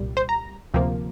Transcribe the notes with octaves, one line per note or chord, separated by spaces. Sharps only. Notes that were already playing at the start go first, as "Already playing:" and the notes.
Already playing: C2 A#2 G3
C5
A#5
D2 C3 F3 A#3